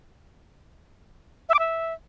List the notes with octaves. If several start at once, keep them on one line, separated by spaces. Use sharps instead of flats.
E5
D6
E5